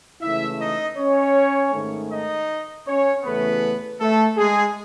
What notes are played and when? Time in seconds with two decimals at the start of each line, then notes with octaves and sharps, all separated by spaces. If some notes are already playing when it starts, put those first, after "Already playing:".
0.21 C#2 C#3 E3 A3 E4 E5
0.59 D#4 D#5
0.97 C#4 C#5
1.72 G#2 D#3 A3
2.10 D#4 D#5
2.86 C#4 C#5
3.24 E2 C#3 E3 A3 B3 B4
4.00 A3 A4
4.37 G#3 G#4